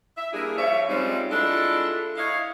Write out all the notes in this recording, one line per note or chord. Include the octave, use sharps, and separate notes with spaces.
E5
G3 A#3 D4 E4 G#4
F3 C#5 E5
F3 G3 G#3 C4 C#4 D#4
G#3 D4 E4 F4 A4
E4 C#5 D#5 F5